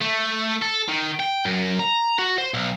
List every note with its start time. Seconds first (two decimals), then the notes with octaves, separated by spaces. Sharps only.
0.02 A3
0.62 A4
0.89 D#3
1.20 G5
1.45 F#2
1.79 A#5
2.19 F#4
2.38 C5
2.54 B1